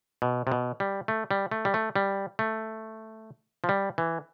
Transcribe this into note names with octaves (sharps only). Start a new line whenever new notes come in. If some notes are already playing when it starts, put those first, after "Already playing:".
B2
C3
B2
G3
A3
G3
A3
G3
A3
G3
A3
F3
G3
E3